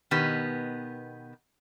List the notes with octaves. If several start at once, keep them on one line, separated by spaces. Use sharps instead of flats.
B2 D#3 B3 G4